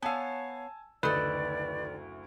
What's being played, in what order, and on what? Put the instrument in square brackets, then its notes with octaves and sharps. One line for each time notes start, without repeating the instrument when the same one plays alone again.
[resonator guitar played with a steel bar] B3 F5 [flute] C#5 [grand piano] G#5 A5 E6
[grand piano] F#1 D2 [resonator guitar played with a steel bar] D#3 A4 [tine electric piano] B4 [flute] D5